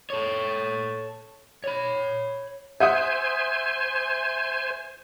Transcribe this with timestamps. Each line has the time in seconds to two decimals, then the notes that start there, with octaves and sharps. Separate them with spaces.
0.10 A4 C#5
1.64 C#5 B5
2.80 C5 E5 F#5 G#5 D#6